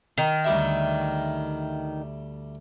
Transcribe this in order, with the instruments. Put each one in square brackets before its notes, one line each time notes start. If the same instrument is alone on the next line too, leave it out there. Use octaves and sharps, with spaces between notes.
[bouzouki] D#3
[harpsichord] D2 G3 E5